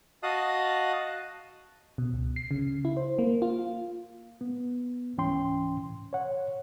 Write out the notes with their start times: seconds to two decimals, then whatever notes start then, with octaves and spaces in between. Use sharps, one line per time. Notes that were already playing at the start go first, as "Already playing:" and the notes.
0.23 F#4 D#5 F5 A5 D#6 F#6
1.98 B2
2.14 C#2
2.36 C7
2.51 C#3
2.85 E4
2.97 C5
3.19 A#3
3.42 F4
4.41 B3
5.17 C#2 G#2 E3 C#4 G5 C6
6.13 C#5 F#5